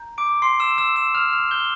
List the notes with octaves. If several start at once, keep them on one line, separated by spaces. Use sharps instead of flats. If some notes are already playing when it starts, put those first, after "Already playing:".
Already playing: A#5 G6
D6 D7
C6 C7
E6 E7
E6 E7
E6 E7
F6 F7
F6 F7
G6 G7